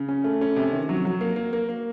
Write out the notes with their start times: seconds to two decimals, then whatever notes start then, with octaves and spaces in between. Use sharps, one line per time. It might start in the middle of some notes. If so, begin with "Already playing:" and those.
Already playing: C#3
0.09 C#4
0.24 A3
0.41 C#4
0.56 C3
0.73 D#3
0.89 F#3
1.05 F#3
1.21 A#3
1.36 A#3
1.53 A#3
1.69 A#3